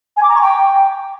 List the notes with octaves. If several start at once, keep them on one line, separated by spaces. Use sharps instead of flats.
G#5
D6
A#5
C#6
G5